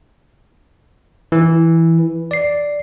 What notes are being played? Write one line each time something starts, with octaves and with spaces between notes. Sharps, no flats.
E3
D5 C7